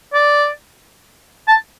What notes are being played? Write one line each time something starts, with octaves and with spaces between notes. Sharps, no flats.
D5
A5